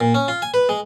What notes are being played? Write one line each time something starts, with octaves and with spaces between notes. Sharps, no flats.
A#2
C#4
F4
G#5
B4
G#3